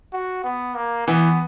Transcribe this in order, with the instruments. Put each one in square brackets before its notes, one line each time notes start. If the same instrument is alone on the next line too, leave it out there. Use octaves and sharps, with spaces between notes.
[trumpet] F#4
B3
A#3
[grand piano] E3 [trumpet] B3